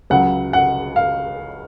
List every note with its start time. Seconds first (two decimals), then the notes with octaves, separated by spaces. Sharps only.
0.10 C#2 C#3 F#3 F#5
0.53 F#5
0.96 F5